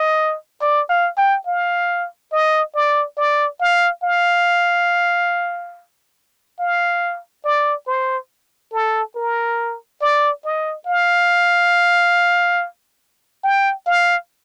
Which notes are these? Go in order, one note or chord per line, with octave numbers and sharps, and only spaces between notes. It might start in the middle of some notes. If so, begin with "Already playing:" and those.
Already playing: D#5
D5
F5
G5
F5
D#5
D5
D5
F5
F5
F5
D5
C5
A4
A#4
D5
D#5
F5
G5
F5